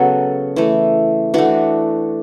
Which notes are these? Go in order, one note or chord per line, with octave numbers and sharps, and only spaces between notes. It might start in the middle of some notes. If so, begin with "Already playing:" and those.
Already playing: C#3 F#3 B3 F#4 A4
E3 A3
E3 A3 D4 F#4